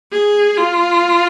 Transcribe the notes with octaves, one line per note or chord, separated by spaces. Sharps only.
G#4
F4